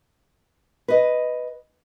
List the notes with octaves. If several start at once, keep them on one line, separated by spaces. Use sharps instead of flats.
B4 D#5